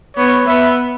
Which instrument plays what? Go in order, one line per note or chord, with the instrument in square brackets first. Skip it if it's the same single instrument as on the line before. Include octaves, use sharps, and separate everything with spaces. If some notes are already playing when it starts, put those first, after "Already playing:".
[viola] B3 [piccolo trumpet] C#5
[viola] B3 [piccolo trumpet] E5